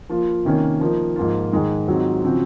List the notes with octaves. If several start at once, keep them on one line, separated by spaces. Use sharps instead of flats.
F3 A#3 F4
C3 D#3 A#3 C#4
F3 A#3 D#4
G#2 F3 A#3 F4
G#2 D#3 G#3 D#4
G#2 D#3 F#3 C4 F4
C#3 F3 C4 F#4